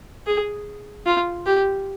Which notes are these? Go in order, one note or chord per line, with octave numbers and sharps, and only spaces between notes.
G#4
F4
G4